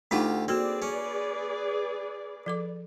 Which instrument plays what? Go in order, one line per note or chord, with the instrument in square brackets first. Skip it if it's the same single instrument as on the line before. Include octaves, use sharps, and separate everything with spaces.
[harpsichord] D2 F4 G4 [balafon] D4 D#4 F#5
[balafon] A#3 F#4 A4 [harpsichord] C4 [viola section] G#4 B4 D5
[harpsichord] C#4
[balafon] F3 A4 D6